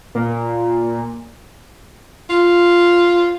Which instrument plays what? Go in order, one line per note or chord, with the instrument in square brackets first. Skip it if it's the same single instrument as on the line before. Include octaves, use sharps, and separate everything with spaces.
[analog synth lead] A#2
[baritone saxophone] F4